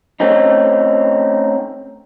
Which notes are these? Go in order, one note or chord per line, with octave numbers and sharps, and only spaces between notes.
A3 C4 C#4 D#4